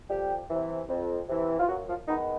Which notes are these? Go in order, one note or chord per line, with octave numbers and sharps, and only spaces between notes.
F2 G3 G4
C3 E3
F2
C3 E3
F4
F#2 F#3 F#4
F3 F4
D#3 G#3 B3 D#4